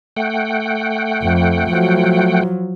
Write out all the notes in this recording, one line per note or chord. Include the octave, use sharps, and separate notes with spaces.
A3 F#5 G5
F2
F3 F#3